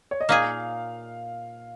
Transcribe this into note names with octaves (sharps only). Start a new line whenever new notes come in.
C#5
D#5
A#2 A#3 D#4 G#4 F5